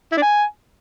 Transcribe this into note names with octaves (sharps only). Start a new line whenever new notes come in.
E4
D4
G#5